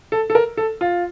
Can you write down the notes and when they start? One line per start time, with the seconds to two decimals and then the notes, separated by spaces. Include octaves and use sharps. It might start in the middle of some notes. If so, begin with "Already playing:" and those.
0.12 A4
0.30 A4
0.35 A#4
0.57 A4
0.81 F4